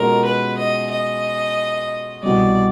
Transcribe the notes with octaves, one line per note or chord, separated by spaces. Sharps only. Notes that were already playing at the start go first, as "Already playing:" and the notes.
Already playing: B2 G#3 C#4 F4 A4 A#4
B4
D#5
D#5
C2 B2 G3 D5